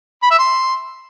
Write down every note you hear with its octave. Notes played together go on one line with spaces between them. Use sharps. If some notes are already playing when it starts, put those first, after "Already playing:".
B5
E5
C6